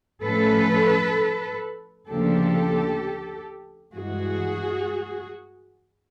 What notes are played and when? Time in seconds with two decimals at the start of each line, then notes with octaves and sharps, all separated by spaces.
0.23 A2 F3 A3 C#4 A4 B4
2.09 D2 C#3 F3 A#3 D4 G4 A4
3.95 G2 E3 G#3 F#4 G#4